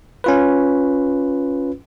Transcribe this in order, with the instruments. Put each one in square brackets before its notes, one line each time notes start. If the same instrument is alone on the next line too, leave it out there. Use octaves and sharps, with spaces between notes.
[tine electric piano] C#4 F4 B4